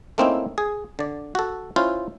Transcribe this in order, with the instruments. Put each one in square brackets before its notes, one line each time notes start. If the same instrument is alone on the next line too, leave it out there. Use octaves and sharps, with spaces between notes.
[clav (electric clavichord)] A3 A#3 C4 C#4 D#4 E4
G#4
D3 D5
F#4 A4
C#4 E4 F4 C5